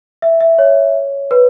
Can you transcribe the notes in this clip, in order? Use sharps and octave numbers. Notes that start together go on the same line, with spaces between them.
E5
E5
C#5
B4